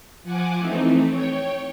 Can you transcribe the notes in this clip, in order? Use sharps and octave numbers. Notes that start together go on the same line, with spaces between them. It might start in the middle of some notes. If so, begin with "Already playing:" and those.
F3 F#5 G#5 D6
E3 A3 C4 D#4
C#5 G5